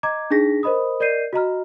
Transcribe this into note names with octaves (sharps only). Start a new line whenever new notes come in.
D#5 A#5 D6 G#6
D4 D#4 G#4 A#6 B6
A#4 C5 D#5 B5 D#6
A#4 D5 D#5 G6 C7 D#7
F#4 D#5 A#5 F6